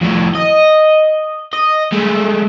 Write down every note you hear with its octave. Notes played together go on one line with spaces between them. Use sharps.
F2 A2
D#5
D#5
G#3 A3